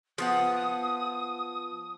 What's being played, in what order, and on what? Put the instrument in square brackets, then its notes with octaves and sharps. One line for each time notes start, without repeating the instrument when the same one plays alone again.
[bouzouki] F3 B3 F#5 [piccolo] D#6